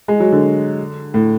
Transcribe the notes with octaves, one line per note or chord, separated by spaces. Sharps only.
G#3
F#3
D3
A2